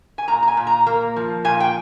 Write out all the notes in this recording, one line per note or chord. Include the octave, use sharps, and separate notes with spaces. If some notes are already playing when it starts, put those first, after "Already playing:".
G#5
A#2 A#5
A#5
G#5
A#2
A#5
A#3
F3
A#2 G#5
G5